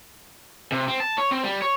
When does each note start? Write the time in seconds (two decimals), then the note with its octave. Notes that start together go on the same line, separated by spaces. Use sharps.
0.72 C3
0.88 C4
1.00 A5
1.18 C#5
1.31 C4
1.43 G3
1.62 C#5